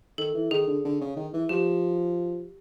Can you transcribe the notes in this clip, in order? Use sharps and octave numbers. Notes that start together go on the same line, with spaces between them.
D#3 A4
E3
D#3 G#4
D3
D3
C#3
D#3
E3
F3 G4